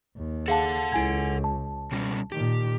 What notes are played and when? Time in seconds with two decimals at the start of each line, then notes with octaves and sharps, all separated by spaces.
0.16 D#2
0.48 G#4 A4 F5 F#5 A5
0.92 C#2 E4 G#5 G#6
1.44 A5
1.92 B2 G3 C#4
2.32 A#2 D#3 G4